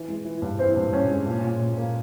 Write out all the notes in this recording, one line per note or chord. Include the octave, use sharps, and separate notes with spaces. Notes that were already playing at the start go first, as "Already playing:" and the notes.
Already playing: E3
G#3
E3
G2
E3 C4 C5
G2
G2 C#4 C#5
G#3
A#2
A#2
A#2
A#3